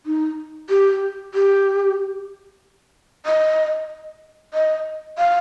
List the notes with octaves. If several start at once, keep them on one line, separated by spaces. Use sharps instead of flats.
D#4
G4
G4
D#5
D#5
F5